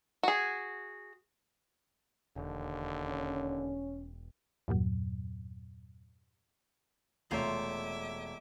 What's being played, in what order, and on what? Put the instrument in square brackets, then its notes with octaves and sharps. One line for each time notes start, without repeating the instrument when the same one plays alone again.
[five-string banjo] F#4 G#4
[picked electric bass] E1 [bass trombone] D#2 [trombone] D3
[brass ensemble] C#4
[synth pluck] E2 G2 A#2 F#3
[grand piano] E1 A3 C#5 [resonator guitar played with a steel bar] C3 F4 A#5 [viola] E5 D6